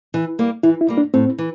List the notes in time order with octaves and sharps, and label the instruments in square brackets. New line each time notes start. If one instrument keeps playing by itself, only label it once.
[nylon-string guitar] E3
G3 A#3
[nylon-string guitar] E3 [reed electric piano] E4
[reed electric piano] E4
[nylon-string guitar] G3 A#3
[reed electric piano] D4
[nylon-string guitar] A2 [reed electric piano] C4
[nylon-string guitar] E3